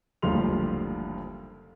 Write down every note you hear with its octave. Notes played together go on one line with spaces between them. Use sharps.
F#1 D2 F3 G3 C6 F7